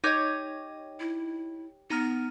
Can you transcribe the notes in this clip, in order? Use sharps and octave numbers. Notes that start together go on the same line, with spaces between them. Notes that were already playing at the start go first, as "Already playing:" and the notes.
D#4 G4 C#5 D#5 G6
E4
B3 D#4 A#5 F6